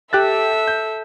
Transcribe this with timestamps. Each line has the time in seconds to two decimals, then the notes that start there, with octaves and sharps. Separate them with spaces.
0.13 G4 A4 E5 F#6 A6
0.68 G6